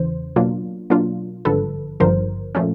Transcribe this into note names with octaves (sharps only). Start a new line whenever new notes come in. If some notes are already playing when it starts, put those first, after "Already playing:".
Already playing: E2 C#3 E3 C5
B2 F#3 A#3 D4 F4
B2 F#3 A#3 D4 F4
G#1 G2 D3 F3 A4 B4
G#1 G2 D3 F3 A#4 C5
A#2 F3 A3 C#4